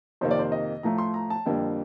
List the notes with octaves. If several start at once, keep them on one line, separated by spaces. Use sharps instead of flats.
F2 C3 D#3 A#3 C5
D5
C5
D#5
A2 F3 A3 A#5
C6
A#5
A5
F2 D3 G3 A#3 G5